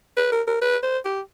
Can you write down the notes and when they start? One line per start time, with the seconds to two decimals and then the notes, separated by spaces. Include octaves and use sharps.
0.17 B4
0.32 A#4
0.47 A#4
0.62 B4
0.83 C5
1.05 G4